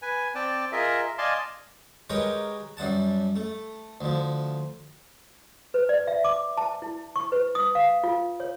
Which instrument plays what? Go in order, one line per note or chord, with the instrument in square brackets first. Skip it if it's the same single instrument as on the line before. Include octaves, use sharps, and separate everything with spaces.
[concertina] B4 G#5
C4 D5 G5 A5
F4 G#4 A#4 D#5 E5
D5 D#5 F5 G#5 A5 C6
[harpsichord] G#3 G4 A#4 B4 C#5
F#2 G3 F#5 A5
A3
D2 F3
[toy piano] B4
D5
E5
D6
A5
E4
C#6
B4
D#6
F5
F4
C#5